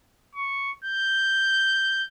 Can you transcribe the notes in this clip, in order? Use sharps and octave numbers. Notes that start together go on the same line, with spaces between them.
C#6
G6